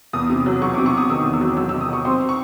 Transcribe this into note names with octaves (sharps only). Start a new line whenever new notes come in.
E2 D#6
C3
F#3
F#3 C#6
D6
C3
C#6
C3 D#6
D#3 E6
E2
E6
F#3
F#3 E6
E6
C3
D#6
F#3 C#6
C4 C6
C#6